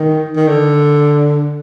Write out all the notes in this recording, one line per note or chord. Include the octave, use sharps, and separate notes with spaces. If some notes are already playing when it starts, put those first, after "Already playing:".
Already playing: D#3
D#3
D3